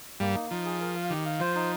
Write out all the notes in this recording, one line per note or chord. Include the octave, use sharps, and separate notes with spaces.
G2 G3 A#3
D#4
F3 D#4
G#4
A#4
F5
D#3 G4
F5
F3 C5
D#4